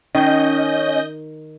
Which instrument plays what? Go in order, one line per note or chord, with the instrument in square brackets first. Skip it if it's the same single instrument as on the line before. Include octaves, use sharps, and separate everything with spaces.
[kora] D#3 [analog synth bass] C#4 [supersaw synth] D#5 G6